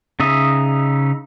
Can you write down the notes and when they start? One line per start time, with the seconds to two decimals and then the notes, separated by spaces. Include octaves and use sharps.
0.20 C#3 D#4 D#5 E5